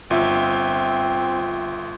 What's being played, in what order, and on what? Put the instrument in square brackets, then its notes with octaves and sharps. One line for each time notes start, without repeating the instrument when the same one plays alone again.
[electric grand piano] G1 F4 E5 [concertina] C4